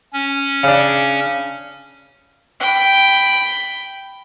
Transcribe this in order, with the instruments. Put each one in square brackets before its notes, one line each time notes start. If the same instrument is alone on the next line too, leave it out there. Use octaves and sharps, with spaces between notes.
[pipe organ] C#4
[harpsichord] C#3 D4
[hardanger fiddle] G5 B5